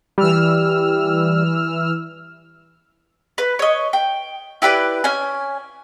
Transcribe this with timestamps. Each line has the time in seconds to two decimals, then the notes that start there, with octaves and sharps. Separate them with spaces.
0.18 E3 G3 E6 F6
3.38 B4
3.59 C#5 D#5
3.93 G5
4.62 E4 G4 B4 D5
5.04 C#4 G#5